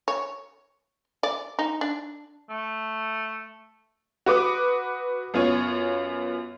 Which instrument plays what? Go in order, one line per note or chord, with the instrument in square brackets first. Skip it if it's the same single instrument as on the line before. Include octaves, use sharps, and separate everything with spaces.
[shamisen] C#5
D5
D#4
D4
[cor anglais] A3
[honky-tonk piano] F#4 B4 D6 D#6
F#2 B3 F4 C#5